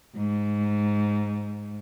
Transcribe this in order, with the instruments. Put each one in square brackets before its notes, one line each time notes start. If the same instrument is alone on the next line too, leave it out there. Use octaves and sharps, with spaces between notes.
[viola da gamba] G#2